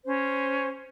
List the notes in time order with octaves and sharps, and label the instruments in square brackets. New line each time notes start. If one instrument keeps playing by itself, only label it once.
[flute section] C#4 C5